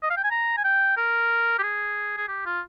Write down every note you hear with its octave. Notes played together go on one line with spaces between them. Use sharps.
D#5
F5
G5
G#5
A#5
G#5
G5
A#4
G4
G#4
G#4
G4
F4